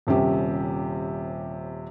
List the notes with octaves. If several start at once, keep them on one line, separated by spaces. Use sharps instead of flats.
D#1 C3 C#4 G4